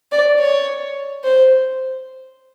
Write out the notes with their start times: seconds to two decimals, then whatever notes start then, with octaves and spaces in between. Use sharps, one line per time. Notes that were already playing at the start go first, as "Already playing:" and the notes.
0.12 D5
0.40 C#5
1.24 C5